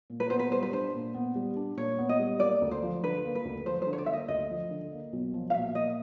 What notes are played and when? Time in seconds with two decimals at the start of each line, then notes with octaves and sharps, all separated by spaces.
0.10 A#2
0.20 B4
0.30 B3 C5
0.39 B4
0.52 G3 C5
0.63 B4
0.72 D4 C5
0.94 A#2
1.14 B3
1.35 G3
1.56 D4
1.77 A#2 C#5
1.98 B3
2.09 D#5
2.19 G3
2.40 A#3 D5
2.62 D2
2.71 C5
2.82 F3
3.03 D3 B4
3.25 A#3
3.35 B4
3.45 D2
3.66 F3 C5
3.82 D3 C5
3.93 C#5
3.98 D5
4.06 A#3 E5
4.13 D#5
4.28 D2 D#5
4.50 F3
4.71 D3
4.92 A#3
5.13 B1
5.34 F3
5.50 F5
5.54 A#2 E5
5.75 A#3 D#5